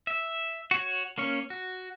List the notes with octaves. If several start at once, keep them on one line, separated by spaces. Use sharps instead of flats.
E5
F#4 C#5
A#3 C#4 C#5
F#4